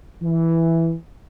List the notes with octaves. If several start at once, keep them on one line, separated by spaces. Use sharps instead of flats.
E3